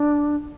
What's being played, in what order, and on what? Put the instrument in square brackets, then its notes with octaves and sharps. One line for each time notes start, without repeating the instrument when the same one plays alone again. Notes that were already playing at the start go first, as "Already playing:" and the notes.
Already playing: [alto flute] D4